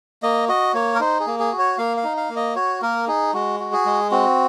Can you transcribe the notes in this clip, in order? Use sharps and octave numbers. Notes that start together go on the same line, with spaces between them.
A#3 D#5
F#4 D#5
A#3 C#5
A#4
D#4 C5
G#4
A#3
G#4
F#4
C#5
A#3 F5
F5
D#4
F5
A#3
D#5
F#4 C#5
A#3 A#4
D#4 G#4
G#3 F#4
F#4
G#4
G#3
C4 F#4